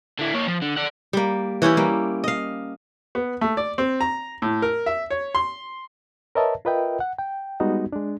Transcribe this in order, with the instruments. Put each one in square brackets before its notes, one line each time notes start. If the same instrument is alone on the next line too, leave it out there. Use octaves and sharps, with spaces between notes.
[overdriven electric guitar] D3 E4
A#3 C#5
F3
D3
D5 F#5
[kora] G3 A#3
E3 C#4 E4 G4
G3 A#3
D#5 F5
[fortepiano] B3
A3
D5
C4
A#5
A2
A#4
E5
C#5
C6
[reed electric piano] A#4 B4 C#5 D#5 E5 A5
F4 A#4 B4 D#5 E5 G5
F#5
G5
G3 G#3 B3 D#4 F#4
G#3 D4